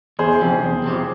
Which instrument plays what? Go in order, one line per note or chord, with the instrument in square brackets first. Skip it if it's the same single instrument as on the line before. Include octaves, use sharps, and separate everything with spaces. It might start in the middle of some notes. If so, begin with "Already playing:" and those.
[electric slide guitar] E2 [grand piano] G#4 C5
[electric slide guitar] C3 F3 C4 G4
E2
C3 F3 C4 G4